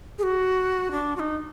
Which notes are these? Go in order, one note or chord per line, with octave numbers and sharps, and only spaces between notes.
G#4
F#4
D4
F#4
D#4